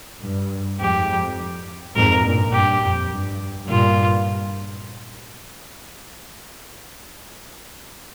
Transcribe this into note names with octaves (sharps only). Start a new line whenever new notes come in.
G2
F2 G#2 G4
F2
F2 G#2 A#4
G2 A#2
G2 G4
F2
G2
G2 A#2 F4